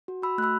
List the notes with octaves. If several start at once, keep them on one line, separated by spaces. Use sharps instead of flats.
F#4
F#4 B5 E6
A3 B5 E6 F#6